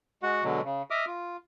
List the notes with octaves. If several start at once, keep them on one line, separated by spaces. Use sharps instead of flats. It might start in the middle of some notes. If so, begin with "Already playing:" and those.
G#3 F#4 F#5
B2 D3 F#3 G#3
C#3
D#5 E5 D6 D#6 F6
F4